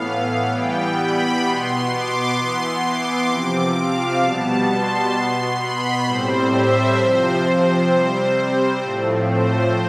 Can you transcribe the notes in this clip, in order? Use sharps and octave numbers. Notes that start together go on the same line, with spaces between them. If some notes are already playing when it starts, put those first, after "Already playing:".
Already playing: A2 E3 B3 F5
E3 G3 B3 G5
B5
B2 B3 C6
D6
E3 B3 C6
D6
C3 F3 C4
F5
B2 G3 B3 A5
C6
B2 B3 C6
B5
A2 G3 C4 C5
E5
C3 F3 C4 C5
C5
C3 G3 C4
A2 F3 A3 C4
C5